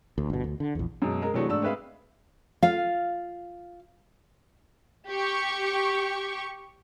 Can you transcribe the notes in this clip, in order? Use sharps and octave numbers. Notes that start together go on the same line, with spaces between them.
D2
G1 B2
D2
D3
A#1 E2
F#2 B2 G#3
G#3 A#4
C3 E3 F#3 A3 D4 G#4
G#2 A3 D4 E6
G#3 C4 B4 E5 F5
F4 F5
G4 C#6